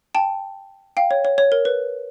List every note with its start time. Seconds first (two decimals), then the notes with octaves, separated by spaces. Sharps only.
0.15 G5 A5
0.97 F5 G5
1.11 C#5
1.25 C#5
1.38 C#5
1.52 A#4
1.65 B4